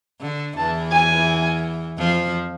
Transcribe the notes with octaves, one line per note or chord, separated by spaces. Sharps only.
D3
E2 E3 A5
G#5
F2 F3